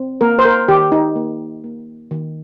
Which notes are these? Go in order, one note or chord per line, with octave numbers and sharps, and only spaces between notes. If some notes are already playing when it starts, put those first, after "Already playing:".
Already playing: C4
A#3 A#4
C5
A#4
D#3 G4
D#4
A#3
A#3
D#3